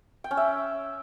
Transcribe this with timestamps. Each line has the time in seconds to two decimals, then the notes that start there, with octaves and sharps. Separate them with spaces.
0.24 G5
0.31 C#4
0.37 E5